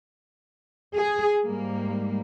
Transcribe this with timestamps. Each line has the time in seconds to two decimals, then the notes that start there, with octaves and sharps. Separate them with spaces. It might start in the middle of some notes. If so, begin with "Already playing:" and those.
0.94 G#4
1.45 G#2 G3 A#3